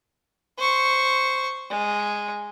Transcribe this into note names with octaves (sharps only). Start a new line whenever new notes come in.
C5 C#6
G#3